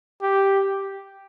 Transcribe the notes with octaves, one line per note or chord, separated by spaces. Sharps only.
G4